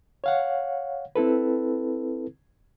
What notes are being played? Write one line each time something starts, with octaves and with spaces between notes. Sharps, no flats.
C#5 F5 F#5
C4 E4 A4 B4